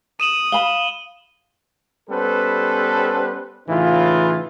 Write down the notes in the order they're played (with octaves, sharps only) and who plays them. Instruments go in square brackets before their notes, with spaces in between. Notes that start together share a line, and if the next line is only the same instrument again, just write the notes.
[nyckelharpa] D#6 [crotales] D#7 E7 F#7
[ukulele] F5 B5 [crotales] G7
[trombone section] G3 B3 C#4 A4 B4 C5
A2 C#3 E3 D#4 F4